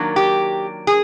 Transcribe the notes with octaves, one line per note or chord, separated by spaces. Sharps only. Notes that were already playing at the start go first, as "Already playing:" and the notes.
Already playing: D#3 F#3 A#3 D4
G4
G#4